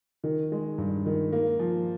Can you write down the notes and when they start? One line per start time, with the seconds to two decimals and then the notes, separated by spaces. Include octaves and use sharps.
0.24 D#3
0.52 G#3
0.78 G2
1.06 D#3
1.33 A#3
1.59 F3